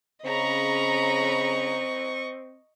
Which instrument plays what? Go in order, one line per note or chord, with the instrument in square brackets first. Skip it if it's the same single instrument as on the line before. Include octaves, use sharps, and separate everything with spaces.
[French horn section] C#3 [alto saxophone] C4 [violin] D#5 C#6 [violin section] A#5 B5